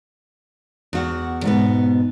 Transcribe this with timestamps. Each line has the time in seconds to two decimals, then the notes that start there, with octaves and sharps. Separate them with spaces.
0.93 E2 F#4
1.44 G#2 B2 B3